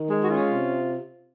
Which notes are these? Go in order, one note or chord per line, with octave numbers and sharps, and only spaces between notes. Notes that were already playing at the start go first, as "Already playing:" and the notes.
Already playing: D#3
G#3
F#4
C#4 F4
C3